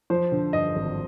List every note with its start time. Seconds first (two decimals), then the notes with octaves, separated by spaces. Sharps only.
0.10 F3 C5
0.32 D3
0.53 G2 D#5
0.76 G#1